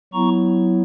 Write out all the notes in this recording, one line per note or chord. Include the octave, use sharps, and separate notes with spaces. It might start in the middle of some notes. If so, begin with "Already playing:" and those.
F#3 B3 E4 A#5 C#6